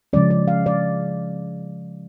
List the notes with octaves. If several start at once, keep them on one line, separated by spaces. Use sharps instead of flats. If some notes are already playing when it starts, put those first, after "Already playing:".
C#3 F3 G#3 C#4 D5
D5
F5
D5